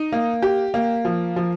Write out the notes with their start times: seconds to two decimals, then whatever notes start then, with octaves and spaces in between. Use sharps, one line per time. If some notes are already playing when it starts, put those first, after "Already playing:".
Already playing: D#4
0.12 A#3
0.42 G4
0.74 A#3
1.05 F3
1.36 F3